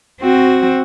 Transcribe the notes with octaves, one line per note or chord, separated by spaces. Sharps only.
C4 F#4